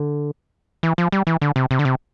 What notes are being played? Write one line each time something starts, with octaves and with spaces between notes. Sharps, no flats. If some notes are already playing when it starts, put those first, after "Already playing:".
Already playing: D3
E3
F3
G3
E3
D3
C3
C3
D3
C3